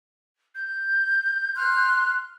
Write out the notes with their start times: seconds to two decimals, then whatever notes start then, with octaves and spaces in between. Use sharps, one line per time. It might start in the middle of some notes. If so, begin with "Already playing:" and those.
0.55 G6
1.56 C6 F6 F#6